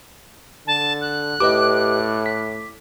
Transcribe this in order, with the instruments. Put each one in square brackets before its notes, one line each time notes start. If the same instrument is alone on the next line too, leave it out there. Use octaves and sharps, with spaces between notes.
[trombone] D3 [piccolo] A5
[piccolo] F#6
[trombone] A2 [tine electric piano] G4 B4 D#5 [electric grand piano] D6
[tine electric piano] B6